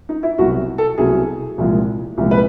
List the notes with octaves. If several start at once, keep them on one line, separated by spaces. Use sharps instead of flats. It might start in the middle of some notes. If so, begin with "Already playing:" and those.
D#4
E4
C2 B2 F#3 F#4
A4
C2 B2 F#3 G#4
C2 A#2 F3 G#3
C2 A#2 F3 G#3
B4